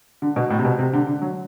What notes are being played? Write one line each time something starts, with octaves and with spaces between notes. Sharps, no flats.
D3
B2
A2
C3
B2
C3
D3
D3
F#3